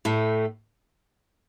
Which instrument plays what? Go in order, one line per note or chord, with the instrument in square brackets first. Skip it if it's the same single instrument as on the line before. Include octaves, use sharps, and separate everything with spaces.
[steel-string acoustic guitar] A2 A3